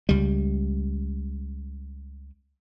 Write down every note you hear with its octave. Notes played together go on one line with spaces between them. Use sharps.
C#2 G3